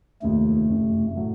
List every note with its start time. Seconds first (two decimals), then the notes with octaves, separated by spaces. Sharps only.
0.22 F1 D#2 D#3 A3
0.69 F#1 F2 C3
1.15 A2 F#3 A3